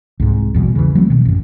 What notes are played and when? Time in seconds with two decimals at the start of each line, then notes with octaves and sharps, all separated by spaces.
0.20 C2 G#2
0.54 A#1 E2 B2 G3
0.75 C#3 E3
0.95 F#3 A3 B3 C4
1.10 B2 D#3
1.25 A1 F#2